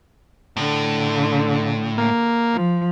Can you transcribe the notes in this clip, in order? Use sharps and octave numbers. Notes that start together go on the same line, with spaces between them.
A2 D3
A#3
F3